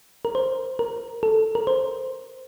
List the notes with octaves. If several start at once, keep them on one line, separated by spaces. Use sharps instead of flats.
A#4
C5
A#4
A4
A#4
C5